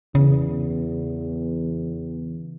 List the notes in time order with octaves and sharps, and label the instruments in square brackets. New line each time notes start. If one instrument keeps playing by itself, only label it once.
[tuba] E2 [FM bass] C#3